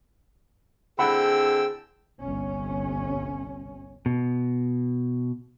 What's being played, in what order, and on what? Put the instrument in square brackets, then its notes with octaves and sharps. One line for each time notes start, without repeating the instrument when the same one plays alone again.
[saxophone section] D3 C4 E4 [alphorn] G#4 [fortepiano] F#5 B5 [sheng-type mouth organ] G5 E6
[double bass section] G1 C2 C#4
[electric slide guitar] B2